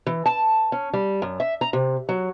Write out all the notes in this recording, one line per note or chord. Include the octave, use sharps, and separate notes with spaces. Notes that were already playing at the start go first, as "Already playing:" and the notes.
E3
A5
C#4
G3
F#2
E5
A#5
C3
F#3